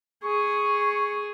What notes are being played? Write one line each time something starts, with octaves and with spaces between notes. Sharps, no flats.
G#4 C#6